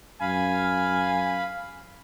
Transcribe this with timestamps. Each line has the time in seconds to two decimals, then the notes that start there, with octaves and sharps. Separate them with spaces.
0.21 F#2 F5 G#5 B5